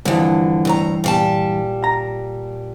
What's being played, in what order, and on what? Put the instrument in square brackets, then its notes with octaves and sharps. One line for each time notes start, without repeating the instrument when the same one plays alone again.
[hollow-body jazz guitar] G2 E3 [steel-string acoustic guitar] D3 F3
[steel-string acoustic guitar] D2 A2 A#5
A#2 G3 A5
[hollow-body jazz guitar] A#5